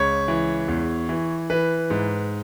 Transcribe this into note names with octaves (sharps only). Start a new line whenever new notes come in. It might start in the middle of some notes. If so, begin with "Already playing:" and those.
Already playing: C#2 C#5
E3
E2
E3
E3 B4
G#2